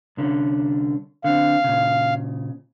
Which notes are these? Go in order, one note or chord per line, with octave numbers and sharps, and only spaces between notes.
C2 D3 C#4
D3 C4 F5
A#2 C#3